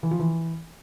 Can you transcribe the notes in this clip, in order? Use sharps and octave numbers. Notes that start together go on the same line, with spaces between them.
E3
F3
E3